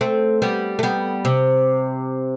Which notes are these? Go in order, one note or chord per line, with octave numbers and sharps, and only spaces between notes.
A3 C4
G3 B3
A3
G3 B3
C3